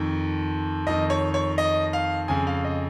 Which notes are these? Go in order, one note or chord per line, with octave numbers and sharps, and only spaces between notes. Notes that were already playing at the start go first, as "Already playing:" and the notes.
Already playing: F2 D#3
F2 D#3 D#5
C#5
C#5
D#5
F5
F2 C#3 G#5
F5
D#5